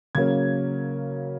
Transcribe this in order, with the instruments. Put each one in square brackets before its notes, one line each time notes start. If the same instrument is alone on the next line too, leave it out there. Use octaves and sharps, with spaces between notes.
[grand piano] C#3 F#3 A#3 C#4 G#6